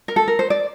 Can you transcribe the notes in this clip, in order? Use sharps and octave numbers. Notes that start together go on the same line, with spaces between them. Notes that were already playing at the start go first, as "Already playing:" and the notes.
A#4
A4
A#4
C5
D5